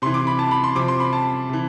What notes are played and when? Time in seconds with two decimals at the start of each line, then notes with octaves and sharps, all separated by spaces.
0.02 C3 E3 C6
0.14 D6
0.27 B5
0.39 A5
0.51 B5
0.64 C6
0.75 C3 F3 D6
0.88 C6
1.00 B5
1.13 A5
1.49 C3 E3